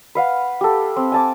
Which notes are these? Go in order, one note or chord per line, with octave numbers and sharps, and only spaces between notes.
B4 F5 F#5
G4 A4
C4
G#5 A5 D6